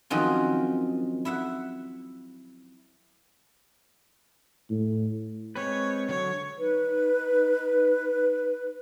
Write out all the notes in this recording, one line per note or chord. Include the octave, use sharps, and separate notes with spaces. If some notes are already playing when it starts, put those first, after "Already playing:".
D#3 F3 F#3 C4 C#4
E4 E5 F#5
A2
G#3 C4 B4 C#5
D3 F#3 C#5
D#4 B4